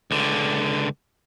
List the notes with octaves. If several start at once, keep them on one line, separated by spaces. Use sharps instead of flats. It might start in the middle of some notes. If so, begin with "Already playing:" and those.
C#2 D3